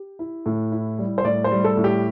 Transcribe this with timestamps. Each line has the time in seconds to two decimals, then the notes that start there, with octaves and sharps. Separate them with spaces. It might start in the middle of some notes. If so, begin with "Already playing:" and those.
Already playing: G4
0.19 E4
0.46 A2
0.72 E4
0.99 G3
1.18 C5
1.24 A2 D5
1.44 C5
1.52 G3
1.64 A4
1.77 A2
1.84 G4